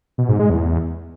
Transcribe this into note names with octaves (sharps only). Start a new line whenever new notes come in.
B2
G#2
G#3
E2